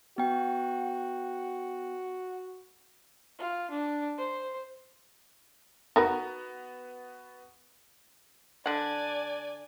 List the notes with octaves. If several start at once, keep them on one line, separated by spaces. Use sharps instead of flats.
B3 F#4 G5
F4
D4
C5
B3 D#4 F#4 A#4 B4
D3 D5 F#5 G#5